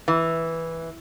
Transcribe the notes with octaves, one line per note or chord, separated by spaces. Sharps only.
E3